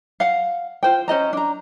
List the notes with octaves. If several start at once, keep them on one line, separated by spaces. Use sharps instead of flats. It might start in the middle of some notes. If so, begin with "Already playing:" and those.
F5 F#5
F4 C5 G5
C#4 C5 D#5 A#5
D4 A#5